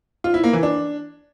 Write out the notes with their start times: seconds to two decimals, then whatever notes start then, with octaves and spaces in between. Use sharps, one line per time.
0.24 F4
0.34 E4
0.44 A#3
0.53 E3
0.63 D4